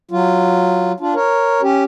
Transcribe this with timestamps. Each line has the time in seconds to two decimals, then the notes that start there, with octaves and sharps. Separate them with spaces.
0.11 F#3 F4
1.00 D4 F4
1.15 A#4 C#5
1.62 C#4 G4